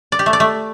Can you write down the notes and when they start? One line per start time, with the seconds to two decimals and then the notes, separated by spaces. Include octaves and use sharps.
0.12 D5
0.19 G4
0.26 A3
0.33 D5
0.40 A3